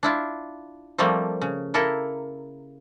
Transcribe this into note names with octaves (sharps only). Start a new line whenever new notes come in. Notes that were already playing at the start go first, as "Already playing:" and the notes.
D4 E4 F4
F3 G3 A3 A#3 C4
C#3
A#3 E4 A4 A#4